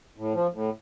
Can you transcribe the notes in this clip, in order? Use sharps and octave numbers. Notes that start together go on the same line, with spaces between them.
A2
F3
A2